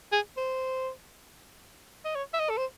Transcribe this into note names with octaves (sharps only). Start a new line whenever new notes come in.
G#4
C5
D#5
C#5
E5
D#5
A4
C5